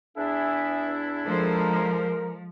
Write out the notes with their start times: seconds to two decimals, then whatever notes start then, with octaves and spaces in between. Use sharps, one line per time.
0.17 E2 D4 E4 G#4 E5
1.26 F3 G#3 A4 A#4 C5